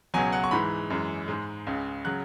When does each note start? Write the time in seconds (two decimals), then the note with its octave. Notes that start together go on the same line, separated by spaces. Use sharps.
0.14 C#2 B2 F#3 G#5
0.32 F#5
0.44 C#6
0.51 G#2 E3 G#3 B5
0.90 F#2 E3 G#3
1.28 G#2 G#3
1.67 C#2 C#3 G#3
2.05 C#3 F#3 F#6